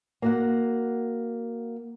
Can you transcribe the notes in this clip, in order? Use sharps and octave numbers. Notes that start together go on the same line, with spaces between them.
A#3 F#4 F#5